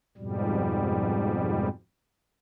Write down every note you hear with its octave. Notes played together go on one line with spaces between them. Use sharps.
F2 G#2 B2 G3